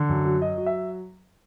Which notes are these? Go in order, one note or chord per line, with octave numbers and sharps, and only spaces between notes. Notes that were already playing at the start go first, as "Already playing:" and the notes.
Already playing: D3
F#2
F#3
F#3 D#5
F#3
E5